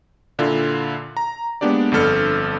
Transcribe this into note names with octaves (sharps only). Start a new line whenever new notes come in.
A#2 D3 E4 F4
A#5
G#3 A#3 B3 D4 G4 D5
G1 F2 D3 A4 F6 C#7